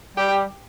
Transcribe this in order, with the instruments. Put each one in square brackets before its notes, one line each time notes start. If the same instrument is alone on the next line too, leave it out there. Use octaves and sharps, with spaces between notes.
[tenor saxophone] G3 [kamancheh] G4